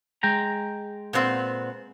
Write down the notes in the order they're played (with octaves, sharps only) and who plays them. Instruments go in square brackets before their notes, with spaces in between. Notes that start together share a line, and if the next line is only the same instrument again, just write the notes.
[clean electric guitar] G#3 G5 A#5
[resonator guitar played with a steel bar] A#2 B3 C4